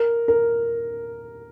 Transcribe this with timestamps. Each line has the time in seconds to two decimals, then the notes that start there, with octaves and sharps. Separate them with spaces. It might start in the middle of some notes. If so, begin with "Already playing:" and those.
Already playing: A#4
0.28 A#4